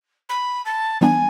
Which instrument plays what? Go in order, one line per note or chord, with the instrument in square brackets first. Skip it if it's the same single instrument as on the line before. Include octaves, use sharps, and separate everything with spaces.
[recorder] B5
A5
[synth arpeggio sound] E3 G3 B3 D4 [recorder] G#5